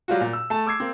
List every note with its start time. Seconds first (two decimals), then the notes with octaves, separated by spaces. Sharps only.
0.08 F#3 G3 F4 F#4
0.21 A#2
0.33 E6
0.50 A3 A5
0.66 D6 E6 G#6 C7
0.80 A#3 C4